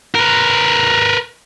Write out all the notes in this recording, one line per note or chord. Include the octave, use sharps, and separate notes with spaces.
A#4 B4